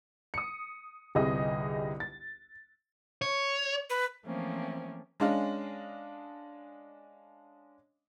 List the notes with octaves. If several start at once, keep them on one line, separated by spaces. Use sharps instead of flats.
D#6 C#7
G1 C2 G3 G#4 D#5 D#6
A6
C#5
B4
E3 F3 A3 A#3 C4 C#4
G#3 C#4 D4 D#5 F5